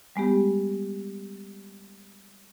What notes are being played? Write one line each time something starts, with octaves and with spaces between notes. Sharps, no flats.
G3 G#3 B3 G4